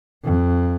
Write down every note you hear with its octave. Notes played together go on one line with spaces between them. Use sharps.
F2